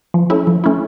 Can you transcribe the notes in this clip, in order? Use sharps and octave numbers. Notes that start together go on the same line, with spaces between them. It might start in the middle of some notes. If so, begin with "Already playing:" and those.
F3
A3 C#4 E4
F3
A3 C#4 E4